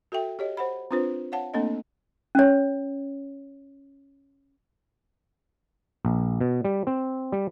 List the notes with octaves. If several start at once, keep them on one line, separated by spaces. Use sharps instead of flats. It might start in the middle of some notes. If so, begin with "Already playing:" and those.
F#4 A4 E5 G5
G4 C#5 D#5
C5 F#5 B5
C4 D4 F4 B4 C5
C#5 F5 F#5 A5
A3 A#3 C4 D4 A4 D#5
C#4 C#5
A#1
B2
G3
C4
G3